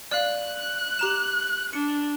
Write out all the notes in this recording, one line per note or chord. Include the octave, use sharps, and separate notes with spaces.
D5 F5 F#6
G4 A#5 E7
D4 C#7